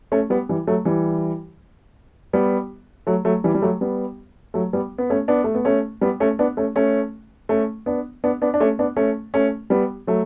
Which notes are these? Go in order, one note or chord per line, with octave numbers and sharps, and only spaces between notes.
A3 C#4
G3 B3
E3 G3
F#3 A3
E3 G3
G3 B3
F#3 A3
F#3 A3
E3 G3
G3
F#3 A3
G3 B3
F#3 A3
G3 B3
B3
A3 C#4
B3 D4
A3
B3
A3 C#4
G3 B3
A3 C#4
B3 D4
A3 C#4
A3 C#4
A3 C#4
B3 D4
B3 D4
B3 D4
D4
A3 C#4
B3 D4
A3 C#4
A3 C#4
G3 B3
F#3 A3